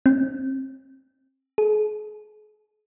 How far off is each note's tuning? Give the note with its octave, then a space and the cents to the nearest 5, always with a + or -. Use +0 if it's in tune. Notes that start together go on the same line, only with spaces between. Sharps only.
C4 +30
G#4 +40